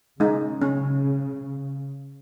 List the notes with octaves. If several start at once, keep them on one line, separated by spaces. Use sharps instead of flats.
C#3 G#3 D#4
C#4